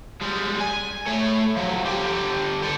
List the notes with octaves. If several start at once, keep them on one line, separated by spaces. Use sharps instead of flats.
G3 G#3
G#5
A3 C#5
F3 F#3
D3 G4
G4 A4